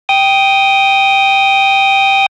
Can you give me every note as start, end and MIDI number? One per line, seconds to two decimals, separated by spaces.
0.09 2.26 79
0.09 2.26 87